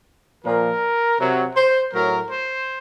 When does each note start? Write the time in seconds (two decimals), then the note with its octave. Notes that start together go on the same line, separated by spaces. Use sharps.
0.44 A#2 F3 A#4
1.19 C3 F#3
1.56 C5
1.93 A2 F#3 A#4
2.30 C5